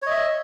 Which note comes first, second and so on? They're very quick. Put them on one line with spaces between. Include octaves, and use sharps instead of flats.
C#5 D#5 E5